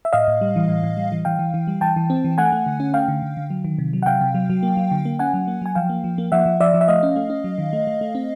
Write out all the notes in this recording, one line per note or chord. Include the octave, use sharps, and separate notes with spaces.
E5
A2 D#5 F5
A2
G3
E3
A2
A2
G3
E3
E3 F5 G5
E3
E3
G3
E3 G5 A5
E3
C4
E3
A3 F#5 G#5
A3
D3
C#4
A3 F5 G5
D3
D3
D3
F#3
D#3
C3
F#3
F#5
C3 F5 G5
C3
F#3
F#3
A#3
F#3
D3
A#3
C#4 F#5 G#5
F#3
A#3
F#3 G#5
F3 F5 G5
A#3
F3
A#3
F3 E5 F#5
F3
F3 D5 E5
F3
E5
A3 D#5 F5
C#4
A3
C#4
F#3
D#3
A3
A3
A3
C4